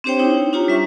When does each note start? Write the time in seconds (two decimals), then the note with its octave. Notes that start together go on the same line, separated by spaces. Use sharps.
0.04 C4 D4 G4 C5 C#5 G5
0.19 D#4 E4 C#5
0.53 D4 F4 G4 C#5 A#5
0.68 G3 E5 C#6